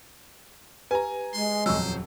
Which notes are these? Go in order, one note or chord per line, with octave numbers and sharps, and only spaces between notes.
G4 B4 G#5 A#5
G#3 C6
D#1 F2 F#3 C5 C#6 E6